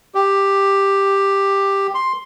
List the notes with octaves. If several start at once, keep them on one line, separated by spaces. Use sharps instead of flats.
G4
C6